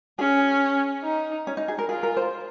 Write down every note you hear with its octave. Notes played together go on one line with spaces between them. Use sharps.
C#4 G#4
D#4
C#4
D#4
G#4
A#4
F4 G#4
A#4
C5